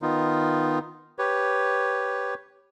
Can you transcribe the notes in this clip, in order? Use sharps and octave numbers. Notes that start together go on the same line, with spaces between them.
D#3 B3 D#4 F4
G4 B4 C#5